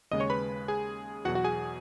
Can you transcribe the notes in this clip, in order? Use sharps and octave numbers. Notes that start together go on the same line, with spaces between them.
D#2 C#3 G#3 D#5 D#6
C#5 C#6
B4 B5
G#4 G#5
E2 B2 F#3 F#4 F#5
F#4 F#5
G#4 G#5